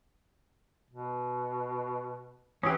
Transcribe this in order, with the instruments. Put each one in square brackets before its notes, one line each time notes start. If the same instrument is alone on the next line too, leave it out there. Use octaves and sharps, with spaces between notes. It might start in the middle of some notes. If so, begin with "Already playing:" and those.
[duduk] B2
[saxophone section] E3 [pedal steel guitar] C#4 G4 [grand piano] D#6